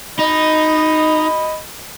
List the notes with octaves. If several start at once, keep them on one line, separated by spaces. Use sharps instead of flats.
D#4 D#5 B5